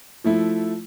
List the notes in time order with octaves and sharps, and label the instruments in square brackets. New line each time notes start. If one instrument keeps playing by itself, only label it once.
[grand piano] F3 A3 E4